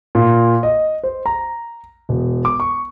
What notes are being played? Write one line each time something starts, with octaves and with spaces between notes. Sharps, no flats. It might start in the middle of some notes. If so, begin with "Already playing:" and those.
A#2
D#5
C5
A#5
E1
D6
C#6